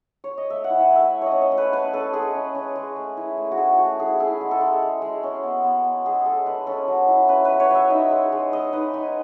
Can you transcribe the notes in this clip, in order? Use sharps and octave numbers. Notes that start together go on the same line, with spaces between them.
C#5
D#5
A3 E5
F#5
E4
G#5
A3
E5
E4
C#5 D#5
C#4
C#5
A3
B4
C#4 B4
C#4 A4
G#3 G#4
C#4
C#4
G#3
A3
E4
A3
F#4
A3 G#4
A3 F#4
E4 G#4
E4 G#4
G#3
A4
G#3
G#3
G#3
C#4
B3
B3
B3
G#3 G#4
G#3 A4
G#3 B4
C#4 A4
F#3
E4
C#4 B4
B4
F#3
C#5
F#3 E5
D#4
G#3
G#3
G#3 D#5
D#4 B4
D#4 G#5